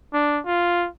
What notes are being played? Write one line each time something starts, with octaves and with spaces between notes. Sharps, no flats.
D4
F4